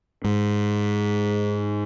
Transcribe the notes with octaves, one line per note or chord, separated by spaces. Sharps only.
G#2